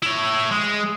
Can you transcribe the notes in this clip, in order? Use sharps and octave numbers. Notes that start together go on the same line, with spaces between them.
E4 C#5
G#3